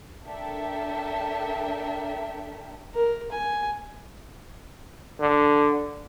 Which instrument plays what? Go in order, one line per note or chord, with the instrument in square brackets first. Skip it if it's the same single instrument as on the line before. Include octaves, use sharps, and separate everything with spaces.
[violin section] D4 A4 A#4 E5 G5
[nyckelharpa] A#4
G#5
[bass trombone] D3